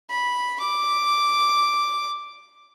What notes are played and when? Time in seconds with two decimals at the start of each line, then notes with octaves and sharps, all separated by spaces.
0.10 B5
0.60 D6